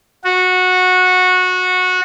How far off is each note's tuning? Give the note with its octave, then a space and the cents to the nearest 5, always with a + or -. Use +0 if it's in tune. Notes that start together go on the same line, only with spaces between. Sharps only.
F#4 -15